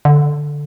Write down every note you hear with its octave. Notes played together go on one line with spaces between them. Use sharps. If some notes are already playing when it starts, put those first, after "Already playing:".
D3